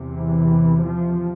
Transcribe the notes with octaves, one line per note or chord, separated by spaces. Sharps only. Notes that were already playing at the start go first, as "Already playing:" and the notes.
Already playing: E2 C3
E3
F3